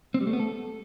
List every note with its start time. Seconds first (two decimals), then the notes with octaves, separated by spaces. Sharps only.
0.14 C4
0.21 G3
0.27 A3
0.33 B3
0.39 A4